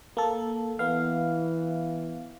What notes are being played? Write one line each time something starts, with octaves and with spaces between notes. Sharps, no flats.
A#3 A4
E3 B3 F5